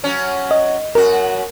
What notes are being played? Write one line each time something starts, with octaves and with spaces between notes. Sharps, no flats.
F#3 C#4
D#5
F#2 F#4 A#4